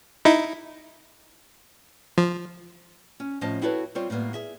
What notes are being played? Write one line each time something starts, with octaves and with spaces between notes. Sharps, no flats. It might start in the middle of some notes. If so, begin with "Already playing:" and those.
D#4 E4
F3
C#4
A2 F3 C4 C#4 D#5 A5
C4 E4 F#4 A4 B4 C#5
G3 C4 F4 C5 C#5
A2 G3 A#3 B3
G#4 E5